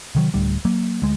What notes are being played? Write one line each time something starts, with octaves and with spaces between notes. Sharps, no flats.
C3 D#3 F#3
D1 D2 G3
F#3 A#3
D2 G#3